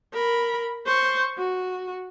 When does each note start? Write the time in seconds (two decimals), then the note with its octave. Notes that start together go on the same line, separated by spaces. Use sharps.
0.14 A#4 B5
0.86 C5 C#6
1.38 F#4